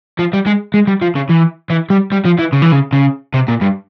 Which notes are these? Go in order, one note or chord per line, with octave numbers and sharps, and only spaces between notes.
F3
G3
G#3
G#3
G3
F3
C#3
E3
E3
G3
G3
F3
E3
C#3
E3
C#3
C#3
C3
A#2
G2